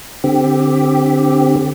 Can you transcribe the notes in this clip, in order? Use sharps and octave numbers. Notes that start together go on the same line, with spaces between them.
D3 C4 G4